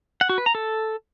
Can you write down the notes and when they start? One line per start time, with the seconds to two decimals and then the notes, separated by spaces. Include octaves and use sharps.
0.21 F#5
0.29 F#4
0.38 B4
0.46 A#5
0.55 A4